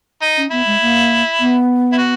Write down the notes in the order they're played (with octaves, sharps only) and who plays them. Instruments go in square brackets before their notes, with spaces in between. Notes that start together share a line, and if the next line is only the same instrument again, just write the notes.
[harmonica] D#4
[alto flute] C#4
[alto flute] B3 [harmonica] E4
[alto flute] G#3
A#3
B3
[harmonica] E4
F#4